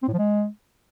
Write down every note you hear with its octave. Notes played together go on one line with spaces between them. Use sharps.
C4
A2
F3
G#3